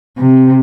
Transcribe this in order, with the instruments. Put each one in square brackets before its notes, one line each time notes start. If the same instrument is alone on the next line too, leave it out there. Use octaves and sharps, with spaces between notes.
[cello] C3